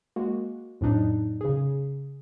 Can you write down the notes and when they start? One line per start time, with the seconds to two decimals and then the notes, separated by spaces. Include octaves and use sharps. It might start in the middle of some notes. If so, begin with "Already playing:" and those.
0.16 G#3 A#3 F#4
0.81 F2 A2 F#3 D4 D#4
1.41 C#3 G#4